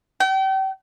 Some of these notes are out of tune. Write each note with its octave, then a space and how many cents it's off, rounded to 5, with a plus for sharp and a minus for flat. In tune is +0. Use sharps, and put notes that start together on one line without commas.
G5 -35